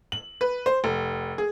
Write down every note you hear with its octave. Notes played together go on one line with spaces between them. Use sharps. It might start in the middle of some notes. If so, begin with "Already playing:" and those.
F#7
B4
C5
F1
G#4